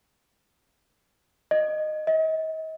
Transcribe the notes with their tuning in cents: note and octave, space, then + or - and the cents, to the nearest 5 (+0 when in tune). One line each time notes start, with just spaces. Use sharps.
D#5 -15
D#5 +40